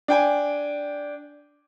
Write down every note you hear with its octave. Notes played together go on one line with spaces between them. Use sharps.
D4 G5 G#5